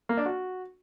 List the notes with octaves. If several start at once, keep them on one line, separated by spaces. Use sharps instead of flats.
A#3
D4
F#4